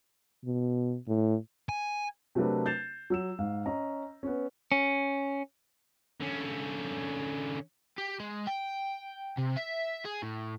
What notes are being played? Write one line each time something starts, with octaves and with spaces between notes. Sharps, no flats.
B2
A2
G#5
C3 F#3 A3 D4 A#4 B4
G6 A6 C7 E7 F7
F#3 E6 E7
G#2 F5
C#4 D#5 A#5
B3 C#4
C#4
D3 C#4
G4
G#3
G5
C3
E5
G#4
A2